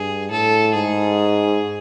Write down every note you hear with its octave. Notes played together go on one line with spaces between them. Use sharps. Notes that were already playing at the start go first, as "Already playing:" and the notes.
Already playing: G2 G#4
A2 A4
G#2 G#4